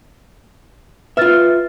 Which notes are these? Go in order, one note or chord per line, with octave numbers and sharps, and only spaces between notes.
F4 B4 E5 F6 A6